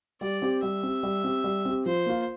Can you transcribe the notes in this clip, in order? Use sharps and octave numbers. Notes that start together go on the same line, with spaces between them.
G3 D5
C4 G4
G3 E5
C4 G4
G3
C4 G4
G3
C4 G4
F3 C5
A#3 F4